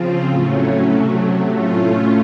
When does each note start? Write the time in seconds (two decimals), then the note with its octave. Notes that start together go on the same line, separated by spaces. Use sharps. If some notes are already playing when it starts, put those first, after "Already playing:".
Already playing: C#3 F3 C4 F4
0.30 A2 F#3 A3 C#4
0.90 C3 F#3 A3
1.50 A2 A3 C#4 F4